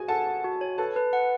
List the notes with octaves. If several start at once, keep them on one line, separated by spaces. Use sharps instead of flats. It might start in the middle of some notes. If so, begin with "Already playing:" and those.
Already playing: F#4 G#4 G#5
A4 F#5 A5
F#4
F#4
C#5
A4 B4 A5
B4
F#5